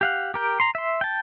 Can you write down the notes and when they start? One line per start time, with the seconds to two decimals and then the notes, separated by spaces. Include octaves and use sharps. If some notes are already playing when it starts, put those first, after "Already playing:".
0.01 G4 F5 F#5
0.34 G4 A#4 G5
0.60 A#5 C6
0.75 E5 C6
1.01 G5 A5